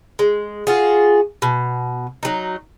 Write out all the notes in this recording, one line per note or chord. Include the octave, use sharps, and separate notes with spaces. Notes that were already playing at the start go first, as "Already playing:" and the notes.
G#3
F4 F#4 G#4
B2
F#3 D#4